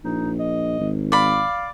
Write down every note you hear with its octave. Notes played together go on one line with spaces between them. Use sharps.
A#1 D#4
D#5
G#1
D5 F5 B5